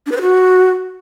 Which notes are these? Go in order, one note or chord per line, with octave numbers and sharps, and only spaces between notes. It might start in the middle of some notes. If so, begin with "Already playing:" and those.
D4
B4
C5
F#4